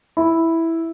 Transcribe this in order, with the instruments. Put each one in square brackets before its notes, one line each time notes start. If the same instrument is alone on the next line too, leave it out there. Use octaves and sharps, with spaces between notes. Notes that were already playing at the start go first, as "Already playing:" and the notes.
[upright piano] E4